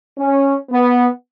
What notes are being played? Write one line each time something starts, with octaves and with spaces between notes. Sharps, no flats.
C#4
B3